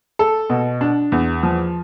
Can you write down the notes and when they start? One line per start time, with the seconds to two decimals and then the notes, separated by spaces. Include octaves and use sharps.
0.19 A4
0.50 B2
0.81 D4
1.12 E2
1.43 F3